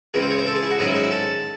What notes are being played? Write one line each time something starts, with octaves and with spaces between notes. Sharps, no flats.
C#2 C#3 E3 C4 G#4
C5
C#5
C5
A4
G#4
E4
F#4
G#2 D#3 F#3 C#4 G#4
E4
D#4
E4
A4